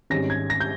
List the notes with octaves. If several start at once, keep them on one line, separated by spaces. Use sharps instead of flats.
G#1 G#2 G3 C#4 A#6
G#6
A#6
G6